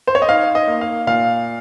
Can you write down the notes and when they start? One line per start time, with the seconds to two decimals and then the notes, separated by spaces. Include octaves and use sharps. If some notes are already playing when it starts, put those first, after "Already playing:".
0.07 C5
0.15 C#5
0.22 D#5
0.29 D#4 F5
0.55 D#5
0.68 A#3
0.81 F5
1.07 A#2 F5